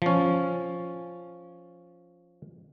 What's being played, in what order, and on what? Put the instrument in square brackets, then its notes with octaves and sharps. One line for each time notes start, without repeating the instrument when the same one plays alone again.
[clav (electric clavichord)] F3 C#4